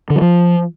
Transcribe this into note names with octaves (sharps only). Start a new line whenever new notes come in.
D3
F#3
F3